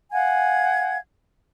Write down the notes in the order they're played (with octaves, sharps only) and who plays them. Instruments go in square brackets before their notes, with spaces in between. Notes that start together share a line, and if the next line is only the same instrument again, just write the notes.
[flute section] F5 F#5 G#5 G#6